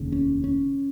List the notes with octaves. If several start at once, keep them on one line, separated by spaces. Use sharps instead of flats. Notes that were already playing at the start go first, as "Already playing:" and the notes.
Already playing: F1 D#2 C#3
C#4
C#4